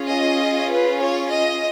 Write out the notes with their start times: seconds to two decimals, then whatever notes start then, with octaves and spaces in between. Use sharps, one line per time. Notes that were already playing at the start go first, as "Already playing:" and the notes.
Already playing: C#4 F4 G#4
0.08 D#5
0.71 B4
1.02 C#5
1.34 D#5